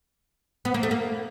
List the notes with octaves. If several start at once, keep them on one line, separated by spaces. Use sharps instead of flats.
B3
A#3
A3
A#3